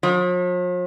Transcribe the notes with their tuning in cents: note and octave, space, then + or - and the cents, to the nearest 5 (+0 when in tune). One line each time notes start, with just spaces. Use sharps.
F3 +45